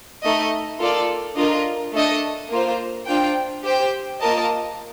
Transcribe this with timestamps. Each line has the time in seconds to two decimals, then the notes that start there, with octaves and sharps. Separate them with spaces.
0.23 A3 D#4 A4 D#5
0.79 A#3 F4 A4 D5
1.36 D4 F4 A#4 D#5
1.93 A3 D4 A4 D#5
2.49 A#3 F4 C5
3.07 D4 F4 C5 G5
3.64 G4 C5 G5
4.20 A#3 F4 A#4 D#5 A5